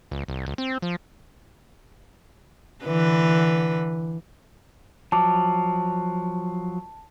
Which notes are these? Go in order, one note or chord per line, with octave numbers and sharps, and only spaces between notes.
C#2
C2
C#2
C4
F3
D3 E3 B4
F3 F#3 A5 D6